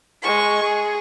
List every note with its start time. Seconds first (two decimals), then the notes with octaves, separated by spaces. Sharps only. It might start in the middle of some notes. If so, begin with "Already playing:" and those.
0.22 G#3 C#6
0.63 G#4